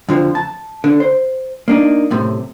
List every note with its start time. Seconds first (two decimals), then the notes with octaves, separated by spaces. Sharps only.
0.09 F2 D3 F3
0.35 A5
0.84 D3
1.00 C5
1.68 A#3 D4 D#4
2.10 F#2 A2 C3